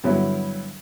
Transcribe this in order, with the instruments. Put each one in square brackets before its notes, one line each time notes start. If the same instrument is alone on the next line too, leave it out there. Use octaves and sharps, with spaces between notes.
[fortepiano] G2 D3 F#3 B3 E4